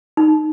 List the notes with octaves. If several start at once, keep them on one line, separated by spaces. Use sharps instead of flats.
D#4